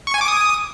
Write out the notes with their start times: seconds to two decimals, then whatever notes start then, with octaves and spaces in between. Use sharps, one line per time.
0.07 C#6
0.14 G#5
0.21 D6
0.28 D#6